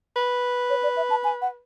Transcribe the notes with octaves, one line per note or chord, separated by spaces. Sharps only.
B4
C#5
D5
E5
A5
G#5
F#5